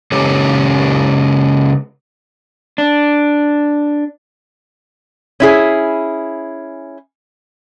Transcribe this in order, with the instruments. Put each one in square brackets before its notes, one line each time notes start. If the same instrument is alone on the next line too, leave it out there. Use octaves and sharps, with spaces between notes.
[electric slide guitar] C#3 G#3 C#4 G4 A4 C#5
D4
[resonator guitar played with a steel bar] C#4 E4 G#4